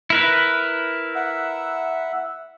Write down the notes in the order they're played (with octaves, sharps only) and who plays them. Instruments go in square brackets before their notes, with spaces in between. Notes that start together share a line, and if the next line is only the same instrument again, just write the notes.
[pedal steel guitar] E4 A#4 B4
[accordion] E5 F#5 E6